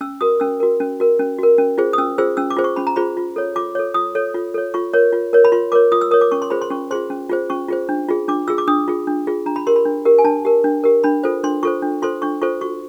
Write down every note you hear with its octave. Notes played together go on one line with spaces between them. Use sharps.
C#4 E6
F#4 A#4 D#6
C#4 E6
F#4 A#4
C#4
F#4 A#4
C#4
F#4 A#4
C#4
F4 G#4 C5
D#6
C#4 E6
F4 G#4 C5 E6
C#4 E6
D6
F4 G#4 C5
C#6
C#4 B5
A#5
F4 G#4 C5 B5
F4
A4 C#5
F4 D6
A4 C#5
F4 D#6
A4 C#5
F4
A4 C#5
F4 C#6
A#4 C#5
F4
A#4 C#5
B5
F4 C6
A#4 C#5 D6
F4 D#6
E6
A#4 C#5 D#6
D6
C#4 C#6
C6
F4 G#4 C5 B5
C6
C#4 C#6
F4 G#4 C5 C6
C#4
F4 G#4 C5
C#4 C#6
F4 G#4 C5
D4
F4 G#4
D4 D6
F4 G#4 E6
D6
D4 D#6
F4 G#4
D4
F4 G#4
D4 A#5
B5
G4 A#4 C6
B5
D4
G4 A#4
G#5
D4 A5
G4 A#4
D4
G4 A#4
D4 B5
F4 A4 C5
D4 C6
F4 A4 C5 C#6
D4
F4 A4 C5 C6
D4 C#6
F4 A4 C5 C#6
F#4 C#6